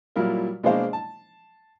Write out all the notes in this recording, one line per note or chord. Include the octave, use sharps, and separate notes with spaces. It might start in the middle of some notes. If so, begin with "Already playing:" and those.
A#2 F#3 G3 E4 F4 A#4
B2 G#3 A#3 D4 C5 F5
A5